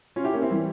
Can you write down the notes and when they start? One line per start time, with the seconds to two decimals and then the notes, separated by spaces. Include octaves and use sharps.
0.16 C#4 F4
0.24 E4 G4
0.33 A#3 C#4
0.42 C4 E4
0.51 E3 G3